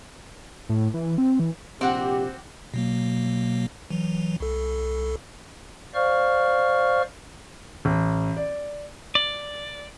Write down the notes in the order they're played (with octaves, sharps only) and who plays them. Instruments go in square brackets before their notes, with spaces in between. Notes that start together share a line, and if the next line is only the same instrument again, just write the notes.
[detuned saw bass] A2
E3
C4
E3
[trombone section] A#1 C3 G4 [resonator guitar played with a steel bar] C4 [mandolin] F#4 F#5 D6
[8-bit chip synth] B2 F#3 A#3
E3 F#3
C2 A4
[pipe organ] C5 D5 F5 C#6 F6
[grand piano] A1
D5
[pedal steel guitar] D5